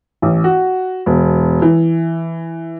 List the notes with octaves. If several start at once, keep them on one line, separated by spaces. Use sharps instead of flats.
A1
F#4
E1
E3